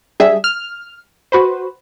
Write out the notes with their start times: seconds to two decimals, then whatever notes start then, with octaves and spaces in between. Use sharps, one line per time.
0.20 G3 D4 G4 G#4 E5
0.44 F6
1.32 F#4 B4 C5